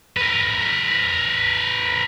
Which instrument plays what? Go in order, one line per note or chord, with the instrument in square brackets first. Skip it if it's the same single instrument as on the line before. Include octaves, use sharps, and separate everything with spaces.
[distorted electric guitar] A#4 B4